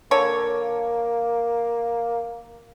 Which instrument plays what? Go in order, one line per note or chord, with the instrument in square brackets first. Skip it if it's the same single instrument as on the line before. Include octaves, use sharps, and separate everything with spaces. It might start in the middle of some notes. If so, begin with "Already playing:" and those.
[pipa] D3 A4 C#5 [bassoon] A#3